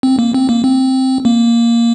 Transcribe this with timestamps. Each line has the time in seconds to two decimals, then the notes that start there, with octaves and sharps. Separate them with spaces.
0.03 C4
0.19 A#3
0.34 C4
0.49 A#3
0.64 C4
1.25 A#3